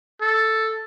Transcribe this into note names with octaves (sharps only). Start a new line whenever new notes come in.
A4